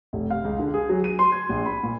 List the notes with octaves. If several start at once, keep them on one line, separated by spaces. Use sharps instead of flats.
F1
F5
C#2
D3
G#4
F#3
D#7
C6
G#6
A#1
B5
A#2